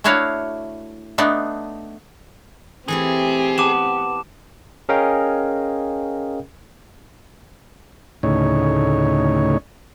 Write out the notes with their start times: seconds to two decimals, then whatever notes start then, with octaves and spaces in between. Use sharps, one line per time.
0.04 A3 D4 E4 F#4 C#5 F5
1.18 A3 B3 D4 D#4
2.88 E3 A3 C4 E4 G4 G#4
3.58 B3 A5 D6 E7
4.89 C#4 G#4 A#4 D#5 F5 G5
8.23 D2 A2 C#3 D#4 C#5